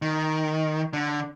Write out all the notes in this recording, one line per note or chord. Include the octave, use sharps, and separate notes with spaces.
D#3
D3